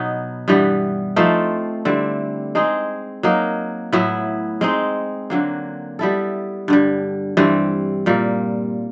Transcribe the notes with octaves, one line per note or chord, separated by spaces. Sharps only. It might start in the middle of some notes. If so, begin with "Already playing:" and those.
Already playing: B2 F#3 B3 D#4
G2 E3 G3 B3
F3 A3 C4 D#4
D3 G3 C4 E4
G#3 C4 D#4 G#4
F#3 A#3 D#4
A2 F#3 B3 E4
G#3 C4 D#4
D3 F#3 A#3
G3 B3 E4 A4
G2 D3 G3
G2 E3 G3 C4
A#2 G3 A#3